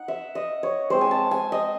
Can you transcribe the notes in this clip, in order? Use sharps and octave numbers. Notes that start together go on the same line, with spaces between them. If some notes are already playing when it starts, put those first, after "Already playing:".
Already playing: D#4 F#5
E5
D#5
C#5
G#3 C4 E4 C5
G#5
A5
G#5
D#5